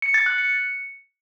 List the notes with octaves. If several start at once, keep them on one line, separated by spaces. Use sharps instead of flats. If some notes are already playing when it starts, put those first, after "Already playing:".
C#7
A6
F#6
C#7